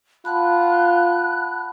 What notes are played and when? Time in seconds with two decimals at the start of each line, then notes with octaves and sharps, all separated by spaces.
0.25 F4 F#5 A5 B5 F#6